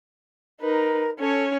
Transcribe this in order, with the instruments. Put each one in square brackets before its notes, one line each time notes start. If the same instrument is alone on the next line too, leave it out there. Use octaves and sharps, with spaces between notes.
[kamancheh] D#4 B4 [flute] A#4
[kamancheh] C#4 C#5 [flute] A4